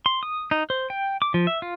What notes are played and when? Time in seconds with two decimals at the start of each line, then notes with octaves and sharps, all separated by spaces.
0.06 C6
0.23 D#6
0.51 D#4
0.70 C5
0.90 G5
1.22 D6
1.34 F3
1.47 E5
1.62 F4